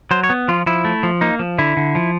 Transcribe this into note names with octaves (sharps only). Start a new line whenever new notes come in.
F#3 C5
C#5
B3
F3 F4
F3 E4
A3
F3
A#3 D#4
F3
D3 E4
D3
F3